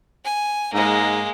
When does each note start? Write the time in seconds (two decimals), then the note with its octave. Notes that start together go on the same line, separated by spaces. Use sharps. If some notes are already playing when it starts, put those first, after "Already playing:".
0.25 G#5
0.73 G#2 G#3 A#3